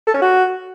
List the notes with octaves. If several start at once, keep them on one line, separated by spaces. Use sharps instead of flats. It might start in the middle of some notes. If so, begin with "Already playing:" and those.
A4
C#4
F#4